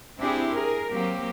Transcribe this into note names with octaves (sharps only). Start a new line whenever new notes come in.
C4 D4 E4 G4 G#4
G#4 A#4
F#3 A#3 C4 G4